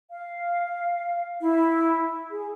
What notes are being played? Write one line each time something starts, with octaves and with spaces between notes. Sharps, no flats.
F5
E4
G#4